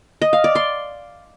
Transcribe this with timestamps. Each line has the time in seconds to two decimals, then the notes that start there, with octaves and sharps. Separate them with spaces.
0.22 D#5
0.33 F5
0.44 D5
0.55 C6